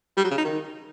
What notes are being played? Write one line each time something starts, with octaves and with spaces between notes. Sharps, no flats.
G3
F#3
C#3
D#4
D#3